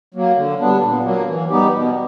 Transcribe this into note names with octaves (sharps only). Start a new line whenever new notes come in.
F#3 A#3
D3
G3 B3 D4
A#2
F#3 A#3
E3
G3 B3 D#4 G4
B2